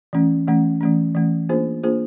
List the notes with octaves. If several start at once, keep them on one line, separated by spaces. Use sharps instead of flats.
E3 A3 C#4
E3 A3 C#4
E3 A3 C#4
E3 A3 C#4
A#3 D4 F4 G#4 C5
A#3 D4 F4 G#4 C5